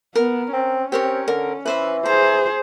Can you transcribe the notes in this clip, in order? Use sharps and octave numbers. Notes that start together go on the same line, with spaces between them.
B3 A#4
C4 C#4
C4 G4 A#4 C#5
D3 A#4
E3 B4 C5 E5
G#4 C5 A#5